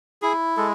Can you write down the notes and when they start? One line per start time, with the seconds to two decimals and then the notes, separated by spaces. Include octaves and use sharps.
0.22 E4 G#4
0.57 G#3 A4